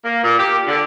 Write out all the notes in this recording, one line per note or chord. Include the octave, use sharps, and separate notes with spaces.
A#3
A#2
G4
D3